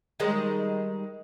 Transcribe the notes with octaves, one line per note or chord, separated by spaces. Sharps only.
D#3 G3 G#3